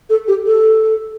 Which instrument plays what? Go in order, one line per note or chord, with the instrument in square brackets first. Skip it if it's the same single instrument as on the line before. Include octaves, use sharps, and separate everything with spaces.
[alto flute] A4
G4
A4